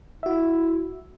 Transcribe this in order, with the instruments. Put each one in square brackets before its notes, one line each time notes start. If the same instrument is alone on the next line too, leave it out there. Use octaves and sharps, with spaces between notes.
[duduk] E4 [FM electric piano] F#4 E5